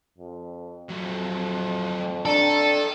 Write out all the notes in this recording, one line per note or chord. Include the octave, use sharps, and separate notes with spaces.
F2
F2 F#3 A3
D4 A4 G5 A#5